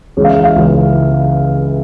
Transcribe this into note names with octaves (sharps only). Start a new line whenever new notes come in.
C#2 C#3 E3 C#5
F5
E5
F5
C#2 C#3 E3